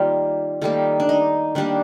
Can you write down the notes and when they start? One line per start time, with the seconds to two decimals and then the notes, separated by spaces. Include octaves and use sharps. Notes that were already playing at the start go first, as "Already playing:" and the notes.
Already playing: D#3 G3 A#3 F4
0.61 D#3 G3 A#3 A4
1.00 D4
1.09 D#4
1.55 D#3 G3 A#3 D4